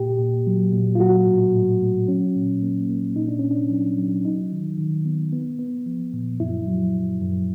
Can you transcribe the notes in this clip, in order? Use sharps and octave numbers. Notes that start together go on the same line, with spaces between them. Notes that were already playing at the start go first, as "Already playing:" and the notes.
Already playing: A#2 G4
A#2
F#3
A#2
F4
F#3 F#4
A2
A2
A2
F#3 C#4
A#2
A#3
A#3
A#2 D#4
D4
A#2 C#4
D4
F#3
F#3
F#3 D#4
D#3
D#3
B3
B3
B3
F3
A#2
F#2 E4
F#3
F#2
F#2